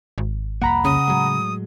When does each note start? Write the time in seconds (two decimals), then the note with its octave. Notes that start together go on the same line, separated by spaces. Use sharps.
0.18 G#1
0.62 C2 F2 A#3 F#5 A#5 B5
0.85 C#3 D#6
1.08 A2 F#3 G#3